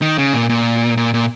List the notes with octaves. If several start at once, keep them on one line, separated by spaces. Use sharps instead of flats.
D#3
C#3
A#2
A#2
A#2
A#2